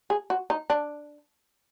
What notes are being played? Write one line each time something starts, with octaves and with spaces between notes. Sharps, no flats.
G#4
F#4
D#4
D4